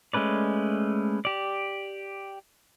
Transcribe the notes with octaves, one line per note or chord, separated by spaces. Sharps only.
G#3 A3 C#4 B4 D5
G4 D5